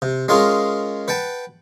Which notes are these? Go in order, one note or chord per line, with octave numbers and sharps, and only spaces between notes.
C3
G#3 C#4 F4 G#4 A#4
B4 F#5 G5 A5